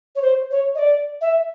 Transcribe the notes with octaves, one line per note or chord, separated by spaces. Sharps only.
C#5
C5
C#5
D#5
D5
E5